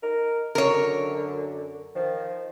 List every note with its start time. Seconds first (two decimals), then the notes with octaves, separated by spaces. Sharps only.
0.03 D#4 A#4
0.55 F#2 D3 A#4 C#5
1.95 D#3 F3